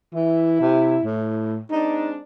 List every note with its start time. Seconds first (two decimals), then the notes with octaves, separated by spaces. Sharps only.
0.14 E3 E4
0.61 C3
1.03 A2
1.71 G#3 C4 D4 D#4